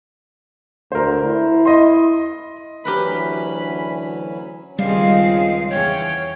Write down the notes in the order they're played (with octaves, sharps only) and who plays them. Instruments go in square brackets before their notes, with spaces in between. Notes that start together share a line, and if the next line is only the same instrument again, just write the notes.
[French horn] D2 [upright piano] A#4 C5
[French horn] E4
[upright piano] D#5 C6
[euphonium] D2 [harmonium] E3 F#3 C#4 [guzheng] G4 A#4 B4 [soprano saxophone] B5
[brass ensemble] C#2 [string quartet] D#3 G#3 C4 [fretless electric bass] G3 [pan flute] F5
[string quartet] E2 C#4 G5 [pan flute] C#5